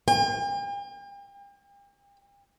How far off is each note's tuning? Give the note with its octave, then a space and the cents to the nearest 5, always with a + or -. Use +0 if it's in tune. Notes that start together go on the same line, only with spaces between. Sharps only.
G5 +45